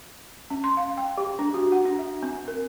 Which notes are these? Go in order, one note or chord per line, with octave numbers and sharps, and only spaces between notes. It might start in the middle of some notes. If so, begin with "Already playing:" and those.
C#4
C6
F5
G5
G4
D4
F#4
F#5
D4
E5
C4
A#4